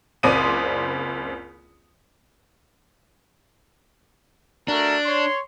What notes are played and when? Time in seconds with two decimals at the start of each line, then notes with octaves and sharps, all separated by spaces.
0.23 F#1 C#2 C4 D5 D#6 D#7
4.68 A3 D4 F#4 A#4
5.06 C#5 C6